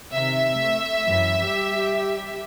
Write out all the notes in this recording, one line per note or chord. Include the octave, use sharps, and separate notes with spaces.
C3 D#3 E5
A3
F#2 E3
G3 G4